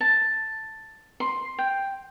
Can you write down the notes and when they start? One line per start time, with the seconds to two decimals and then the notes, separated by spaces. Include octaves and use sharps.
0.01 A5
1.20 C6
1.59 G5